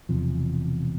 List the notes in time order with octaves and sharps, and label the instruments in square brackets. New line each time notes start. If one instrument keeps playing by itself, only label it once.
[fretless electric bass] E1 E2 C3 F3